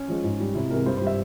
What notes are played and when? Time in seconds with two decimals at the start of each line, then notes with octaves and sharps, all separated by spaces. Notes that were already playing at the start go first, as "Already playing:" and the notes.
Already playing: C#4
0.08 F3 G#3
0.24 G#2
0.40 G3
0.55 C2 E4
0.70 C3 E3 G#3 A#4
0.86 G2 C5
0.97 G3 C5
1.07 E5